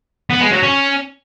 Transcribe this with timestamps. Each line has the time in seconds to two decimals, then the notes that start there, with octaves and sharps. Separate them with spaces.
0.30 B3
0.41 G#3
0.52 F#3
0.63 C#4